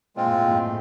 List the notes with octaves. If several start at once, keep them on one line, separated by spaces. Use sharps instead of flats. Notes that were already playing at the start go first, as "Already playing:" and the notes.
A#2 G#3 C4 F4
A2
A#2
A2